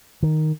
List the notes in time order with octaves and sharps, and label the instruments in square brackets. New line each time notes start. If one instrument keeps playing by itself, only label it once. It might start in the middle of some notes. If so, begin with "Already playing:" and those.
[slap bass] D#3